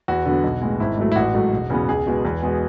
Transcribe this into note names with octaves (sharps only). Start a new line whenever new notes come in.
E2 F#4
D3 F#3 B3
B1
A2 G#3 B3
G#1 E4
G#2 F#3 A3
E4
A1 F#4
G#2 F#3 A3
E1
E2 C#3 F#3 B3
C#2 G#4
B2 G#3 B3
E2
B2 G#3 B3